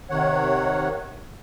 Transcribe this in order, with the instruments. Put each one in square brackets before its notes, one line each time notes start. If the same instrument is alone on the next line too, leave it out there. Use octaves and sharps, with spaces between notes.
[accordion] C3 D#3 C#5 F#5